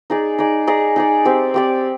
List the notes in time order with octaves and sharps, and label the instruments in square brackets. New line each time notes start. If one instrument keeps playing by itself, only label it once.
[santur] D#4 G#4 D5
D#4 G#4 D5
D#4 G#4 D5
D#4 G#4 D5
C4 G4 D5
C4 G4 D5